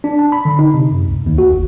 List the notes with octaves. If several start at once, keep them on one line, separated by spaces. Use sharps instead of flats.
D4
A5
B5
D3
D#4
C3
F#2
C#2
D#2
F#4
G1